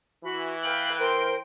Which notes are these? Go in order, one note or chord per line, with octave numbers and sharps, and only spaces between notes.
E3 F#4 B5
B4 F5 G5 F#7
A#4 C5 G5 D7